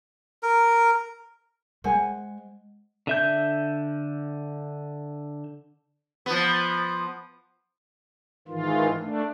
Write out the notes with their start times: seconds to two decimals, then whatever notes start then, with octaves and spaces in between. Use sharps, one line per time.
0.43 A#4
1.84 G#3 C5 F#5 G#5
3.07 D3 E5 G6
6.26 F3 B3
8.48 G#2 D#3 E3 F4
9.00 A3 D4